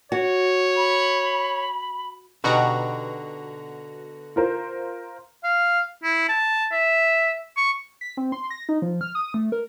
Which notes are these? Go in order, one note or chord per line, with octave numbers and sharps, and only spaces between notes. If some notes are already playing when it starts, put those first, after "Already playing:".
F#4 C#5
B5
B2 D3 D#4 F#4 G4 A#5
F4 A#4 C5
F5
E4
A5
E5
C#6
B6
C4
C6
A#6
D#4
F3
F6
D#6
A3
A#4